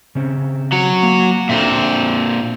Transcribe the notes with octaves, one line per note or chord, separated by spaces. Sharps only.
C#3 C4 C#4
F#3 F#4
A#3
A#2 C4 D4 A4 E5